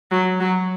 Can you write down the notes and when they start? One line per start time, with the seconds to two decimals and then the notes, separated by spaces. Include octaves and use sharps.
0.11 F#3
0.40 F#3